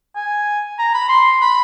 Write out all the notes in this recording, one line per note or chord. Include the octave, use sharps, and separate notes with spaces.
G#5
A#5
B5
C6
B5